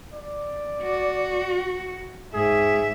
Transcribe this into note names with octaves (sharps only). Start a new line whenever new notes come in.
D5
F#4
G#2 G#4 E5